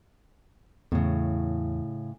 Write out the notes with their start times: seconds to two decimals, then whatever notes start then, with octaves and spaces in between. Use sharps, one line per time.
0.92 E2 A2 C#3